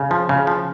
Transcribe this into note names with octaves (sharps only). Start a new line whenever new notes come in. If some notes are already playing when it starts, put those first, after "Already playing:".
Already playing: C#3
F3
C#3
F3